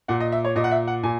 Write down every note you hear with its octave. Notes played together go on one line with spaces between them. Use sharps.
A#2 F#5
D#5
E5
C#5
A#2 D#5
F#5
E5
F#5
A#2 G#5